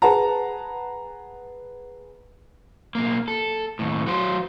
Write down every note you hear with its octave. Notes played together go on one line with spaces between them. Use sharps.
G#4 B4 F#5 A5 A#5
B1 A#3
A4
D#2 A2
F#3 C5